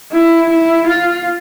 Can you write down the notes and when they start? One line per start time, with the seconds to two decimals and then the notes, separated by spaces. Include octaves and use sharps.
0.12 E4
0.50 E4
0.87 F4